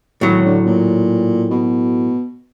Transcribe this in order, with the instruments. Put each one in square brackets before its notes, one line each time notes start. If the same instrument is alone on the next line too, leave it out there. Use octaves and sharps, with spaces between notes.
[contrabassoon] G#1 [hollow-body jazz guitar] A2 F#3
[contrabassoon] D3
A#2
B2